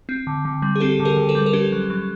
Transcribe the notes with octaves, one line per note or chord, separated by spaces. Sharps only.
C4
D3
D3
G3
G#4
C4 G4 A4
D3
G#4 A#4
D3
A4 B4
G3
A#4
C#4 G4 A4
F#3
F#3